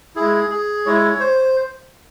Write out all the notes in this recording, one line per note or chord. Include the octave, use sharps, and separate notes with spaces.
G#3 E4 G#4
G#4
G#3 E4 C#5
C5